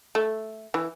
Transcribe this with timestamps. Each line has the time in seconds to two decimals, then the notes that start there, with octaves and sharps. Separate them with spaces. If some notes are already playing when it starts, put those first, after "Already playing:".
0.15 A3
0.74 E3